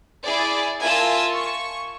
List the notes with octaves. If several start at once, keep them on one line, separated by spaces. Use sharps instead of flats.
E4 G#4 D5
F4 A#4 E5 G#5 A5 E6
C#6